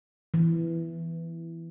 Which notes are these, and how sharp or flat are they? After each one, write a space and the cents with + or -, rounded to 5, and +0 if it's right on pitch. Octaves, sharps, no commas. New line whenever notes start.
E3 +10